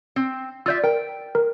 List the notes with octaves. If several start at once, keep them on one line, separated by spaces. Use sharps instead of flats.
C4
F4 D5 E5 E6 G6
A#4 G5
A#4